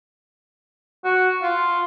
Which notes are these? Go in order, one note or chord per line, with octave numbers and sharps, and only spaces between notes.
F#4
F4